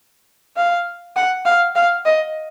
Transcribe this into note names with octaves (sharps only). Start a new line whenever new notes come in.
F5
F#5
F5
F5
D#5